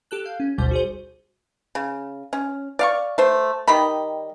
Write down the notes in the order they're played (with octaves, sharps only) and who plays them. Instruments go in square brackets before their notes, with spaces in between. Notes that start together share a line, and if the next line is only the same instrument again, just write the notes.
[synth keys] G4 A4 F#6
F5 G6
C#4
G#1 D2 B2 G3 C5 G6
F#4 G#4 C5
[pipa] C#3
C#4
D5 F5 C#6
A3 C5
D#3 G3 D#5 B5